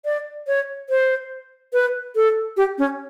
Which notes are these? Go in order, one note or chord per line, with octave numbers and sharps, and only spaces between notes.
D5
C#5
C5
B4
A4
G4
C#4